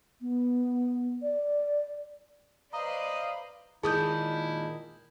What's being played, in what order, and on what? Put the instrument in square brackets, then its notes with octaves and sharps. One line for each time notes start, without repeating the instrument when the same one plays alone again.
[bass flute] B3
D5
[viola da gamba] B4 C5 D5 [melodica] D#5 [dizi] F5 [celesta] A#5
[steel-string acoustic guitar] A#2 D#3 G#3 [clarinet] E4 [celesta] G#4 [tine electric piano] A5 D#6 G6